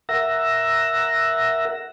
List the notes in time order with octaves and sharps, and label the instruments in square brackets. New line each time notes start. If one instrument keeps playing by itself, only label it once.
[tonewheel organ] A#4 E5 F#5 E6 A#6